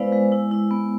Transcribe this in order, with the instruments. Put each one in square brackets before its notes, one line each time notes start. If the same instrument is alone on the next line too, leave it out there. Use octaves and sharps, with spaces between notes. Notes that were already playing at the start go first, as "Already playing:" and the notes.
Already playing: [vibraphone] G#3 B3 E4 B4 C5 D5 F5
G#3
E4
E4
B3